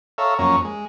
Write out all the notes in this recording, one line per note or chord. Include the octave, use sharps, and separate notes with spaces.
A4 C#5 E5 F5 A#5
F2 F#3 A#3 C#4 A#5 C#6
G#3